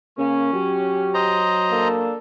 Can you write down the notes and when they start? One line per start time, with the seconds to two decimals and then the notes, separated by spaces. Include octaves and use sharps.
0.18 C#3 A#3 C#4
0.54 F#3 G4
1.14 C5 D#5 A#5
1.71 A#3 D4 A4